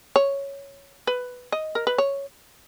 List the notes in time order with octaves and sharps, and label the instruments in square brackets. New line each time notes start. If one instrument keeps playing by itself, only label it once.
[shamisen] C#5
B4
D#5
A#4
B4
C#5